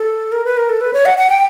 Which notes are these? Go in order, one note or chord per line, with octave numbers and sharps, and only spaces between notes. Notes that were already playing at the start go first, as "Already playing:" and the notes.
Already playing: A4
A#4
B4
A#4
A4
B4
C#5
F#5
F#5
G5